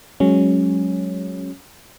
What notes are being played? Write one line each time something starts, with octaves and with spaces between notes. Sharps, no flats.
F#3 G#3 C#4